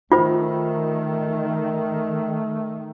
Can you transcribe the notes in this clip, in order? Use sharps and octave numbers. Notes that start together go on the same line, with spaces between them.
D#3 A3 F4 C5